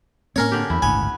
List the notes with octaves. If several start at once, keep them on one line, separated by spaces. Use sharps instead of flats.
A2 A#3 C4 C#4 A#4 C#5
D3 G4
E2 E4
G1 C#2 A2 B3 G#5